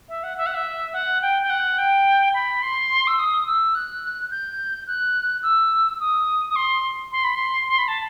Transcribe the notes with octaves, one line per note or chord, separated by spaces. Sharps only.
E5
F#5
E5
F#5
E5
F#5
G5
G5
F#5
G5
B5
C6
E6
D#6
E6
F#6
G6
F#6
E6
D#6
D#6
C6
C6
B5
C6
C6
B5
A5